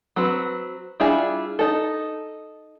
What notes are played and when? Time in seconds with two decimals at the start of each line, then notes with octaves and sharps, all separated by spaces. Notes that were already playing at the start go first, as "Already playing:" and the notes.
0.16 F#3 C4 B4
1.00 G3 D4 E4 F4 G#4
1.59 D#4 A4